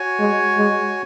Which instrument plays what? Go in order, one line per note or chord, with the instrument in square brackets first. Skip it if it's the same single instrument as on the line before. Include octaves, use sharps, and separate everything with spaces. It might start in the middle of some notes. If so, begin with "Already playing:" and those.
Already playing: [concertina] F#4 C#5 G#5
[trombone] G#3
G#3